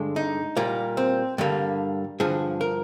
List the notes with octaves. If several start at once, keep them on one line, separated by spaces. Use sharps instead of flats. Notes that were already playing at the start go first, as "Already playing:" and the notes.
Already playing: G2 D3 G#3
D#4
A#2 G3 A#3
C4
G2 D3 G3 A#3
G2 D3 F3 G#4
A#4